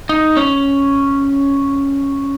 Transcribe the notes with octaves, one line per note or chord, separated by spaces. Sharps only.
D#4
C#4